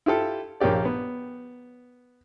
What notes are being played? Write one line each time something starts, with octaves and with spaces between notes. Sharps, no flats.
E4 F4 G4 A4
A#1 A#3 C#4 G4 D5
B3